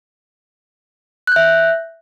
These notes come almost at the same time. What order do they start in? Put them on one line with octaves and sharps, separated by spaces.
F#6 G6 E5